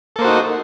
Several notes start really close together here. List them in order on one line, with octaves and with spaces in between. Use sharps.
A4 A#3 C5 F#4 D#4